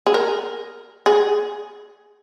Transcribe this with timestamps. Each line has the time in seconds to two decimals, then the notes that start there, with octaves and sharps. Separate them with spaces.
0.07 G#4
0.14 A#4
1.06 G#4